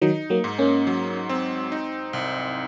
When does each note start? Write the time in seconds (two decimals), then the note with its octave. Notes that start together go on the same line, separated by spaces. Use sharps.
0.01 D#3 F#3 D#4
0.30 F#3 A#3
0.44 G#2
0.59 A#3 C#4
0.87 F#3
1.29 C4
1.72 D#4
2.13 C2